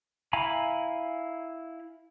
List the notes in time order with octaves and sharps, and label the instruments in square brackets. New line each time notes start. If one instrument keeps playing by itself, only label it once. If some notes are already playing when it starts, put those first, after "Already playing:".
[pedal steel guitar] E4 F5 G#5 A#5 B5